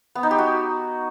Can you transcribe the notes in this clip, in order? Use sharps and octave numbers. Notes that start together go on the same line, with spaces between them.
B3
D#4
G4
F#4